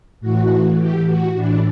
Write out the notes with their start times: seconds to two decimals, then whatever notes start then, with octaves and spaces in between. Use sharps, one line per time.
0.20 A2 E3 F#4
0.78 G4
1.07 F#4
1.35 A2 E3 D4